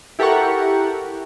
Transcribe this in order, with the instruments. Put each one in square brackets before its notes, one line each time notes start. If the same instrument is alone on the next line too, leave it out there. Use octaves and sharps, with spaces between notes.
[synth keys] E4 G4 A4 A#4 F#5 C#6